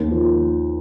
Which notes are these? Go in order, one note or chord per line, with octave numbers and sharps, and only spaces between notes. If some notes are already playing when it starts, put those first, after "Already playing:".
Already playing: D#2
F3